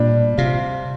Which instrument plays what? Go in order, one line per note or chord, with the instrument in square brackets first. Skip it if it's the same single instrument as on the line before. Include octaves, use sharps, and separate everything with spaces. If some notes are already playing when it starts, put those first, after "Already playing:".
Already playing: [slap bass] A#2 [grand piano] G3 D4
[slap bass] C3 [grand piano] F4